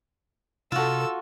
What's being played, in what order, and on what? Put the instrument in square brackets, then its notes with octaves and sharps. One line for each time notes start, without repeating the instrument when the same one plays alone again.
[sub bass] C3 [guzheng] F4 F#4 [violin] A4 E6